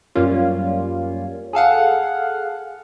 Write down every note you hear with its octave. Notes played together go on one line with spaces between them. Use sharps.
F#2 G3 A#3 C#4 F4
G#4 A4 F5 F#5